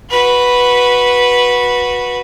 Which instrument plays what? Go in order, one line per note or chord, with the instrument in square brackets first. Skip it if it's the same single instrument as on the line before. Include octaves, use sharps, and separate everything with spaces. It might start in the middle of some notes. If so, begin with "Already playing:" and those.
[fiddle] F#4 B4